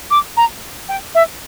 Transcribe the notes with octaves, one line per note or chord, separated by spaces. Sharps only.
D6
A#5
G5
E5